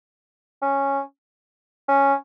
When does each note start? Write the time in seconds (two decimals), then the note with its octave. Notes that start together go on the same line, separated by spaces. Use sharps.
0.62 C#4
1.88 C#4